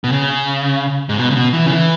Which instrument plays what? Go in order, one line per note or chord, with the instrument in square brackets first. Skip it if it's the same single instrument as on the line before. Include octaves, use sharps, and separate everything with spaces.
[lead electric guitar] B2
C#3
G#2
B2
C#3
B2
E3
C#3
E3